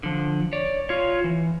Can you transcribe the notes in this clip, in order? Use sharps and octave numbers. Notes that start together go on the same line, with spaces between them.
D3 F3
C#5 D5
F4 C#5
E3